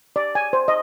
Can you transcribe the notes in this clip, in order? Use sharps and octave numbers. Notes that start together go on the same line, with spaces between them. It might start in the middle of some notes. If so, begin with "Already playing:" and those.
D5
G#5
C5
D#5